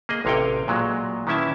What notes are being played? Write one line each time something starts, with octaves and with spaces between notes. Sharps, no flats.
A#3 G#4 D#5
A1 C3 C#5 F5 G5
A#2 F#3 G#3
D#3 E3 C#4 E4 E5 A5